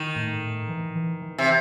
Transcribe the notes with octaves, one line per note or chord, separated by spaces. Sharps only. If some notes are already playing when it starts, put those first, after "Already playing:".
Already playing: D#3
A2
A2
E3
E3
E3
C3